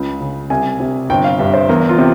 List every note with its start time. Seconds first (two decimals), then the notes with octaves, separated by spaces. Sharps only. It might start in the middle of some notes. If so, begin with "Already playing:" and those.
Already playing: C#2 C#3
0.21 C#3
0.50 C2 G#5
0.80 C3
1.10 G1 G5
1.24 F5
1.39 G2 E5
1.54 C5
1.69 E2 A#4
1.89 F4
1.99 C3